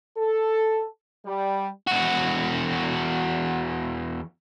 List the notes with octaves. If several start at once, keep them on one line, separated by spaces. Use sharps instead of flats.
A4
G3
E2 F#4